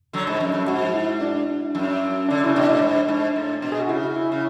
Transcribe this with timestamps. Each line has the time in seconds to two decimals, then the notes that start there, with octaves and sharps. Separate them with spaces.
0.13 D3 F#3
0.27 G#2
0.40 F#2
0.54 F#2
0.67 G#2 F#4
0.94 E4
1.21 D4
1.75 F#2
2.29 D3 D4
2.44 C#3 E4
2.55 B2 D4
2.69 A2
2.82 G#2
3.08 G#2
3.36 A2
3.62 B2
3.72 G#4
3.80 F#4
3.89 C#3 E4
4.16 E4
4.32 C#3